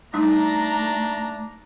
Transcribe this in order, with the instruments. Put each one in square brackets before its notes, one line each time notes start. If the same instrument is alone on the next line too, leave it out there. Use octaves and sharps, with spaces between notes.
[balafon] G3 D#4 [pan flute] A3 [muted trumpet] D4 [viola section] A#5